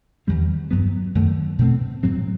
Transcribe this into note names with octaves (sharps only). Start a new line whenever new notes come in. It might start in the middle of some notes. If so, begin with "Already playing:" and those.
E2 D#3 G3 C4
G2 F#3 B3
F#2 D#3 A3
B2 A3 C4
A2 F#3 C4